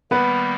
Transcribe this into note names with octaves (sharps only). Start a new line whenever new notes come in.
D#3 G3 A#3 B3 B4